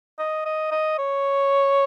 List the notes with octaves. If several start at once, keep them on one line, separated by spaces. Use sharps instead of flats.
D#5
D#5
D#5
C#5